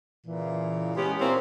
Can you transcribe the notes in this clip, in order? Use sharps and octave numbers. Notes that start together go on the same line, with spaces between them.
A#2 C#3 E3
G#3 B3 C#4 G4
A#2 A#3 C4 C#4 E4